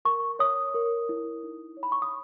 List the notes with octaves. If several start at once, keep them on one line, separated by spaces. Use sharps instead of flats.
A#4 C#6
C#5 D#6
A#4
E4
D#4
C#5
B5
C#6
D#6